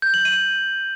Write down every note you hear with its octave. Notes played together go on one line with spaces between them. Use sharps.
G6
F#7
D#7